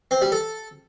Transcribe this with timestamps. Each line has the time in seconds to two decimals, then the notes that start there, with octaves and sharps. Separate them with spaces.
0.11 C4
0.22 G3
0.32 A4